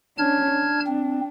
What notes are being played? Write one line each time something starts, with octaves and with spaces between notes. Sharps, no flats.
C#4 D4 A5 F6 G#6
D4
C4